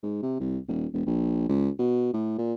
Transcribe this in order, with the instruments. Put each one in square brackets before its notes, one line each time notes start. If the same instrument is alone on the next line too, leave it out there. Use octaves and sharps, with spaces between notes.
[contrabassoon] G#2
C3
C2
D#1
E1
A#1
C#2
B2
A2
A#2